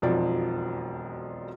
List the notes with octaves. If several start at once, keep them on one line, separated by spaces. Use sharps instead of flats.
E1 B1 F2 F3 D5